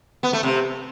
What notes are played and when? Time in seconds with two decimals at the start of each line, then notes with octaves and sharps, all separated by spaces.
0.23 B3
0.33 A3
0.43 C3